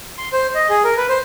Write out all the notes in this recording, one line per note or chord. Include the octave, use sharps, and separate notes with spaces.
C6
C5
D#5
G#4
A#4
B4
C5